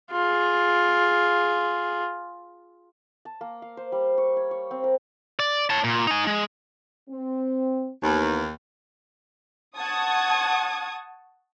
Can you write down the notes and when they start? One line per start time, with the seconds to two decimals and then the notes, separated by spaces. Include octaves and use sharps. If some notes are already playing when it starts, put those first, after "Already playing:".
0.11 F4 G#4
3.25 A5
3.41 A#3
3.62 F5
3.77 C5
3.92 G3
4.18 C#6
4.37 C#5
4.51 C#5
4.71 C4
4.84 A#4
5.40 D5
5.70 C#5 A5
5.84 A#2
6.07 D#4 G#5
6.27 G#3
7.09 C4
8.03 D#2 E3 B3 D#4
9.76 F#5 A5 C#6 D#6 G#6